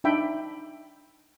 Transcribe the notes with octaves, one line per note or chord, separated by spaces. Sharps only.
D4 D#4 E5 G5 B5